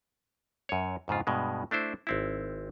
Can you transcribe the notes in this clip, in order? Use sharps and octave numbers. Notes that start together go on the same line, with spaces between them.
F#2 C#5
F2 G#2 C#3 F4
G2 B2 G#3
A3 D4 E4 C5
G#1 C4 E4